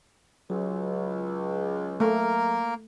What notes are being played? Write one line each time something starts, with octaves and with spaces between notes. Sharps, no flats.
C#2 F#3
A3 A#3 A#4